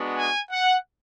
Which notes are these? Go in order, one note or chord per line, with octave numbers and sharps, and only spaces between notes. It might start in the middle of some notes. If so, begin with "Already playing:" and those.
Already playing: G#3 B3 D4 F#4
G#5
F#5